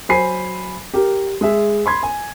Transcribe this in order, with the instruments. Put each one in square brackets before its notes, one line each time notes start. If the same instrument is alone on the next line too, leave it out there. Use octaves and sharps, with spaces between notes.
[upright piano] F#3 C5 G#5 B5 C7
G4 A#4
G#3 G#4 E5
B5 C6 G#6
G#5